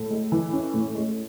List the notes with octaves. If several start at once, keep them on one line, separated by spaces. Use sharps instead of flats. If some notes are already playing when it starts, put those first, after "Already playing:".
Already playing: A2 A4
G#3
E3
C#4
A2
G#3